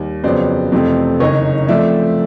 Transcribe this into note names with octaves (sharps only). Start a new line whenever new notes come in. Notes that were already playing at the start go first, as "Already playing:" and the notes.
Already playing: D#2 G3
F2 C#3 F#3 B3 C5 D5
F2 C3 E3 A3 C4
F#1 F#2 D#3 C#5 D#5
F3 A3 C4 D5 E5